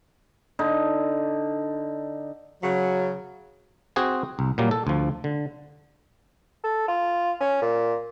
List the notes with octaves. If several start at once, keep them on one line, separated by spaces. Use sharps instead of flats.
D3 D#4
C#3 F#3
C4 F#4 G#4 C5 G#5
C2
A#2 F#3 G3 A#3
A4
D2 F3
D3
A4
F4
C#4
A#2